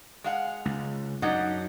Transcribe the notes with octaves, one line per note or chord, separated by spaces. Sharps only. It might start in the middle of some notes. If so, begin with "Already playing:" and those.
G#3 F5 F#5
C#2
F#2 D4 D#4 F#5